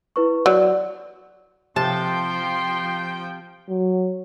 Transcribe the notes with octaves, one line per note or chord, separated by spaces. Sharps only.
E4 B4 C#6
F#3 D5
C3 F3 G5 A5 C6
F#3